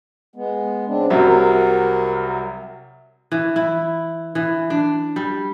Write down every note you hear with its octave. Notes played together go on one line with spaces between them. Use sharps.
G#3 B3
C#3 C4 D4
C2 C3 F#3 A#4 F#5
E3
E4
E3
D4
G3